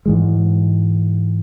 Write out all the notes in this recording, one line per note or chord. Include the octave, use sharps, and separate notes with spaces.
G#2 E3 G#3